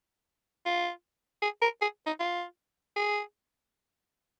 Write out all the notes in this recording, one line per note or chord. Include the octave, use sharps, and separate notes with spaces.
F4
G#4
A#4
G#4
D#4
F4
G#4